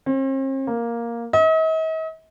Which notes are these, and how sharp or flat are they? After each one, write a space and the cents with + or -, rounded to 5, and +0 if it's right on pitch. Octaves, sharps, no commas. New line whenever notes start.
C4 +45
A#3 +5
D#5 +45